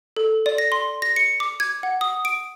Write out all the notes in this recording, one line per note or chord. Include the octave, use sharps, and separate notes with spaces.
A4
D5
A#6
C6
A#6
C#7
D6
G#6
F#5
D#6
D7